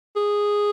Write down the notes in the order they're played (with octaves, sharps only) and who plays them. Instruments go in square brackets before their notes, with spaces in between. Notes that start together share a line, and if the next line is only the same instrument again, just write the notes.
[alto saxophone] G#4